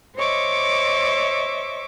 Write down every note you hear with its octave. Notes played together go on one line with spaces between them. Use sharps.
C5 C#5 D#5 E5 C#6 D6